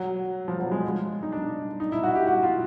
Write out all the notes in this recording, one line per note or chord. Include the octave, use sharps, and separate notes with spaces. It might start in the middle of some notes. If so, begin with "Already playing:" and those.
Already playing: F#3
F3
F#3
G#3
D#4
D4
D#4
E4
F#4
G4
F#4
F4